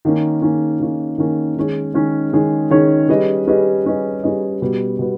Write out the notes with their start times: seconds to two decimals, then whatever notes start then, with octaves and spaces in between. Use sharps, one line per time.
0.05 D#3 A#3 C#4
0.42 D#3 A#3 C#4
0.80 D#3 A#3 C#4
1.18 D#3 A#3 C#4
1.56 D#3 G#3 C#4 G#4 C#5
1.94 D#3 G#3 C#4 G#4 C#5
2.33 D#3 G#3 C#4 G#4 C#5
2.70 D#3 G#3 C#4 G#4 C#5
3.09 G3 C#4 G#4 B4 D#5
3.47 G3 C#4 G#4 B4 D#5
3.85 G3 C#4 G#4 B4 D#5
4.23 G3 C#4 G#4 B4 D#5
4.62 B2 G3 B3
4.99 B2 G3 B3